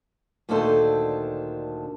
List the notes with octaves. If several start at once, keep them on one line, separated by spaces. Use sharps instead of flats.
D2 A#2 D#3 D4 A4 C5